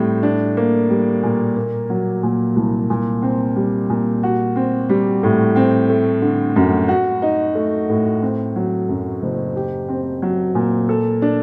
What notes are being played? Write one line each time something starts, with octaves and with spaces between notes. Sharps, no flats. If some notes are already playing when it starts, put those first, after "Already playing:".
Already playing: A2 G3 C4
D4
A#3
G3
A#2
A#3
F#3
A#2
C2
A#2
C4
G3
A#2
F#4
C4
G3
A2
C4
A3
D3
F#2
F#4
D#4
A3
A2
C4
F#3
F#2
F#1
G4
C4
F#3
A#2
A4
D4